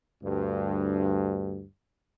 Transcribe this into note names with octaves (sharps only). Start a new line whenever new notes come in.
D2 G2